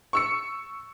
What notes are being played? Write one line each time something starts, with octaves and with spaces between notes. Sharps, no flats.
C#6 E6 C#7